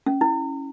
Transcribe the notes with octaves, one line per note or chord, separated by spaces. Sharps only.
C#4
E4